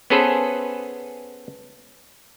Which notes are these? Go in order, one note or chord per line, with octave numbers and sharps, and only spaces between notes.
B3 C#4 G#4 A4 B4 C5